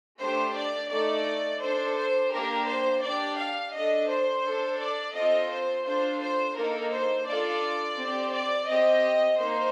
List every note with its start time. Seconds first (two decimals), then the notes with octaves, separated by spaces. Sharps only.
0.19 A3 D4 G4 C5
0.55 D5
0.90 A3 D#4 A4 D5
1.60 D4 A4 C5
1.95 C5
2.31 A#3 D4 G4 A#4
2.67 C5
3.02 D4 G4 D5
3.37 F5
3.73 D4 A4 D#5
4.08 C5
4.43 D4 A4
4.79 D5
5.14 C4 F4 A4 D#5
5.49 C5
5.85 D4 F4 A4 C5
6.20 C5
6.55 A#3 D#4 A4 A#4
6.91 C5
7.26 D4 F4 A4 D5
7.97 C4 G4
8.33 D5
8.68 C4 G4 D#5
9.38 A#3 D#4 C5